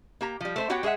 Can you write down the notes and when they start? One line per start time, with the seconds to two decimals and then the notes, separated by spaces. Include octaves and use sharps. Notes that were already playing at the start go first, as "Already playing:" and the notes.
0.21 A#3 G4 A#5
0.41 F3 G3
0.56 A3 C5 E5
0.69 B3 F#4 G4 C#5 F#5 G5
0.83 G#3 G#4 C#5 E5 F#5